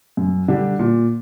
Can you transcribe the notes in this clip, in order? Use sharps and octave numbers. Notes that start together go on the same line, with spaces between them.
F#2
D3 G3 D4 G4
A#2